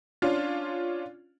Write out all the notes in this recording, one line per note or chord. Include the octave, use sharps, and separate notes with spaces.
C#4 D4 F4